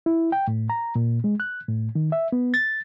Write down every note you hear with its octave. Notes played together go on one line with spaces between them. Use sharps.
E4
G5
A2
A#5
A#2
G#3
F#6
A2
D#3
E5
B3
A6